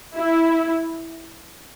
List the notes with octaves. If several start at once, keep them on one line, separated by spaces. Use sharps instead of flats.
E4